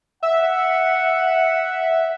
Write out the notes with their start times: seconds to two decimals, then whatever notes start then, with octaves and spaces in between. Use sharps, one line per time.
0.23 E5 F#5